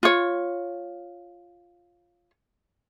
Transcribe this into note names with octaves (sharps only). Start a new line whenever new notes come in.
F4 C#5